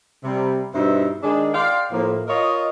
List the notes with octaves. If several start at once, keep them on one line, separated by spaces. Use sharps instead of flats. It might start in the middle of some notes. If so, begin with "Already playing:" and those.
C3 G3
G2 B2 D#4 C5 E5
D#3 G#3 D4 G#4
D5 F5 G5 C6
A2 F3 A#3
F4 A#4 C#5 D#5